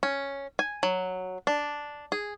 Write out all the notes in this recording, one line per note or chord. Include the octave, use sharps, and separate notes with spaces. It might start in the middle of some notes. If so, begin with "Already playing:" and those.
C#4
G#5
F#3
D4
G#4